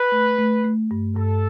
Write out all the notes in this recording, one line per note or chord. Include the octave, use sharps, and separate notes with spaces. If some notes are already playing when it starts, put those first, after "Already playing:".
Already playing: B4
A3
A3
A3
G2
G2 A4